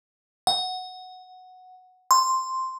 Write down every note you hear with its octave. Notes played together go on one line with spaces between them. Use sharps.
F#5
C6